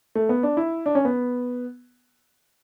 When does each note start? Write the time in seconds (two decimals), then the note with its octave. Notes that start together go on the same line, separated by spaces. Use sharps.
0.15 A3
0.29 B3
0.43 D4
0.57 E4
0.86 D4
0.95 C#4
1.05 B3